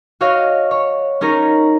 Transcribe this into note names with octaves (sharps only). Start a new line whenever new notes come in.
F#4 C#5 D#5 F5
C#5
C#4 D#4 G#4 A#4 C#5